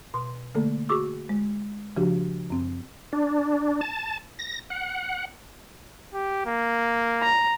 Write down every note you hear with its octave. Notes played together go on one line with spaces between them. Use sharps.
B2 C6
D3 A3 A#3 A4
F#4 G#4 C#6 D6 E6
G#3
C#3 F3 D4 F#4 G4
F#2 C4
D4
A5
A#6
F#5
G4
A#3
A#5